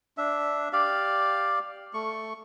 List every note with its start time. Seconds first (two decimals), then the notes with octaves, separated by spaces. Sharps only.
0.18 D4 E5
0.73 G4 D5 F5
1.94 A3 C#6